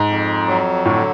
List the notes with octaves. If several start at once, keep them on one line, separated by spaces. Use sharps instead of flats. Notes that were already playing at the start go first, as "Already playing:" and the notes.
Already playing: G#2
F2
F#3
A2 D3